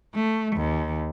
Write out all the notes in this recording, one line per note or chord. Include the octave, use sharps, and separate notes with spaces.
A3
D#2